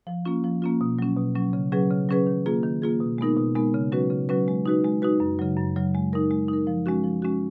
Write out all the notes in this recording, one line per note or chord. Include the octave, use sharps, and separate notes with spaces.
F3
A#3 C#4 F4
F3
A#3 C#4 F4
B2
F#3 C#4
B2
F#3 C#4
C#3
F#3 C#4 G#4 B4
C#3
F#3 C#4 G#4 B4
D#3
A#3 F4 G#4
D#3
A#3 F4 G#4
B2
G#3 B3 D#4 A#4
B2
G#3 B3 D#4 A#4
C#3
F#3 C#4 F#4 B4
C#3
F#3 C#4 F#4 B4
G#3
D#4 F#4 B4
G#3
D#4 F#4 B4
F#2
C#3 F#3
F#2
C#3 F#3
G#3
D#4 A#4
G#3
D#4 A#4
F3
G#3 C#4 F#4
F3
G#3 C#4 F#4